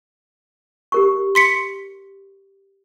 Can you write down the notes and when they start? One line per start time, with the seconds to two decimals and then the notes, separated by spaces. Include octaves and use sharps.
0.92 G4 A#4 C#6
1.35 C6 B6 C#7